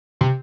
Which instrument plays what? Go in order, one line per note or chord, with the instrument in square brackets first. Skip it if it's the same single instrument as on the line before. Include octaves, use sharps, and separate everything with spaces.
[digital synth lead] C3